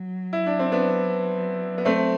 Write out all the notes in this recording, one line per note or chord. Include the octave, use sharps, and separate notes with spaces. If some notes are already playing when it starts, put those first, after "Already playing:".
Already playing: F#3
E4
D4
C4
B3 D4
B3
A3 C4